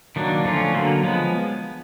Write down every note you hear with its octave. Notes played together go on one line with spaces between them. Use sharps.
D#3 F#3 A#3 D4
D3 F3 A3 C#4 F4
D3 F#3 A#3
F3 G#3 B3